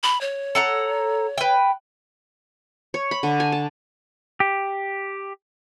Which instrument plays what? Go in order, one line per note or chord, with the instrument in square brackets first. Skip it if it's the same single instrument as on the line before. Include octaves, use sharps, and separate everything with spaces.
[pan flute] B5
C#5
[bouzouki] A4 F#5 A#5
B4 G5
[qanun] C#5
B5
D3
G#5
A5
[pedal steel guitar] G4